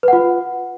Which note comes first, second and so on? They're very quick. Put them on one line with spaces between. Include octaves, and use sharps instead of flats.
B4 F#5 F4